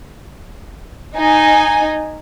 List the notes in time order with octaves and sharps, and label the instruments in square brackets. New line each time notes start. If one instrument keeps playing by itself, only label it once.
[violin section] D#4 G#5